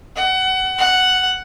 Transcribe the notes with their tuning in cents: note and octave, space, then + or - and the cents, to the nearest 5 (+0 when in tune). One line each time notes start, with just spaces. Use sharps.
F#5 +25
F#5 +5